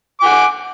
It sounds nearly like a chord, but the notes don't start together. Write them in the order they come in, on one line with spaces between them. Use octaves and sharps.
D6 G#5 F#5